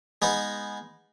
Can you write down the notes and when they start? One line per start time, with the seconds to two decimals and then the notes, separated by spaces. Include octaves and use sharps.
0.22 G#3 B3 D#4